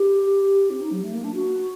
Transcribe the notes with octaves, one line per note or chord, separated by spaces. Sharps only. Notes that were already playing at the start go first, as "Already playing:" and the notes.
Already playing: G4
C4
D#4
F#3
A3
A#3
D4
F#4